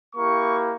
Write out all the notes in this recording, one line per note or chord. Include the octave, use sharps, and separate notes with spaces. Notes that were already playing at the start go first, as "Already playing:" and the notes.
A#3 E4 G4 C#6